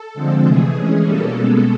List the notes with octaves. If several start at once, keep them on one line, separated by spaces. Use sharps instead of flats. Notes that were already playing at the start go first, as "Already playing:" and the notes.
Already playing: A4
D3 F3 G#3 C4
C3 E3 A3 G#4
E3 G#3 C#4
B2 G3 A#3 C#4 A4
B2 G#3 B3